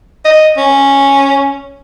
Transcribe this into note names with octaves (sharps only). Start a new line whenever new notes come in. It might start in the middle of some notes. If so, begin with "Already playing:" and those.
D#5
C#4